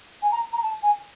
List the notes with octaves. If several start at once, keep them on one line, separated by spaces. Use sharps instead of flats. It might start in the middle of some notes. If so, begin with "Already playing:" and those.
G#5
A#5
A#5
A5
G#5